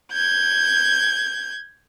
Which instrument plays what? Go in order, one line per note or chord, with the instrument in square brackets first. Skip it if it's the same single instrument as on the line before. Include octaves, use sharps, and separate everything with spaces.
[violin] G6 G#6